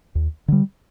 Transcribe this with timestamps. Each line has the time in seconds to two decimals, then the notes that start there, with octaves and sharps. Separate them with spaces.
0.15 D#2
0.48 D3 G3